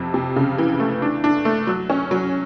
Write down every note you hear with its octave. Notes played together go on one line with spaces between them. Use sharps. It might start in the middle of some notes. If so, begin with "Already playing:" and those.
Already playing: F2 C3
C3
C#3
E3
A3
D4
D4
A3
F#3
C#4
F#3